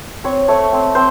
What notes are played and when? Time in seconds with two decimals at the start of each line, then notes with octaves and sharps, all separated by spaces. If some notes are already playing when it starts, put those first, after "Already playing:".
0.24 C4 C#5
0.48 A3 C#5
0.72 C4
0.95 C4 C5